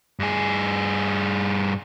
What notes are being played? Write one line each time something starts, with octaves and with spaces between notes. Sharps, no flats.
G2 G#4